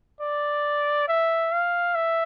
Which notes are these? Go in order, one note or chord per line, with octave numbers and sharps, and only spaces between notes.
D5
E5
F5
E5